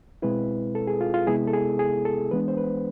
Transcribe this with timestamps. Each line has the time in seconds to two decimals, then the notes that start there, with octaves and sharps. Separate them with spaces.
0.22 B2 G#3 C4 E4 B4
0.75 A4
0.87 G#4
1.01 F4
1.14 F4
1.27 C3 G#3 B3 E4 G#4
1.48 A4
1.53 G#4
1.79 G#4
2.05 A4
2.31 E3 G#3 B3 D4 B4
2.48 C5
2.57 B4